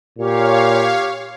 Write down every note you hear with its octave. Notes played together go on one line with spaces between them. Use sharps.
A#2 G4 C#5 F5